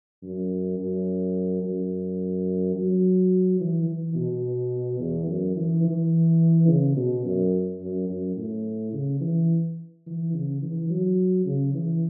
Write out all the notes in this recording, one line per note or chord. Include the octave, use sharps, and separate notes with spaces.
F#2
F#2
F#2
F#3
E3
E3
B2
E2
F#2
E3
E3
C#3
B2
F#2
F#2
F#2
A2
C#3
E3
E3
C#3
E3
F#3
C#3
E3